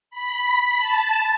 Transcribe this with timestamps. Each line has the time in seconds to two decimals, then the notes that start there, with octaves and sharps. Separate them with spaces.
0.10 B5
0.78 A5